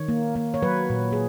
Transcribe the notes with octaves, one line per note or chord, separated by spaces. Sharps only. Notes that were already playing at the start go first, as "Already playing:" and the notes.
Already playing: D#3 C#5
A#3
A#3
C#5
F#3 B4
A#2
G#4